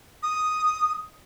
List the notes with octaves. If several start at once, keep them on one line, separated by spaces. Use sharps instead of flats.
D#6